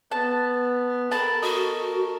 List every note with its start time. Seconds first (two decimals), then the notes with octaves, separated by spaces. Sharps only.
0.11 B3 A5
1.12 A4 A#4 A5 B5
1.42 F#4 D#5